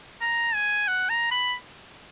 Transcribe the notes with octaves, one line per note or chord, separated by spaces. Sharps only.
A#5
G#5
F#5
A#5
B5